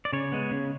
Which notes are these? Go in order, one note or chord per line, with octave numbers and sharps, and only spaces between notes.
D5
C#3 C#5
G#3 B3
C#3